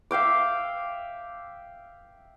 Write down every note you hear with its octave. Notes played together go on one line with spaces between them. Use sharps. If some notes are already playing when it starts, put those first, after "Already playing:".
E5 F5 G5 D6